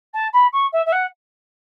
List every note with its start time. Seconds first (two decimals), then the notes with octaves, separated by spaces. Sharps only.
0.13 A5
0.33 B5
0.52 C#6
0.72 E5
0.86 E5
0.92 F#5